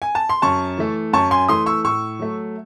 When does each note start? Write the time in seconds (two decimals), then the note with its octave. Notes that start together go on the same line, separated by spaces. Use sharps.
0.02 G#5
0.15 A5
0.29 C6
0.42 F#2 A5 C#6
0.78 E3 A3
1.13 F#2 A5 C#6
1.31 G#5 C6
1.48 E3 A3 C6 D#6
1.66 C#6 E6
1.84 A2 C#6 E6
2.19 F#3 A3